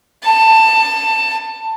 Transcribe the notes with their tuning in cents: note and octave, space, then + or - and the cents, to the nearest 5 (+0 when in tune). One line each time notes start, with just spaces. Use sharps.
A5 +15